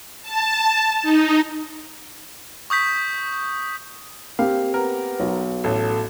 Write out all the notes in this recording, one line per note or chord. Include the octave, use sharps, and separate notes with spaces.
A5
D#4
C#6 D#6 G6 B6
A#3 C4 G4 F5
B3 A#4
B1
A1 A4